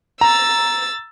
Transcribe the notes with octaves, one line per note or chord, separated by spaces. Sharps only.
A#5 E6 A6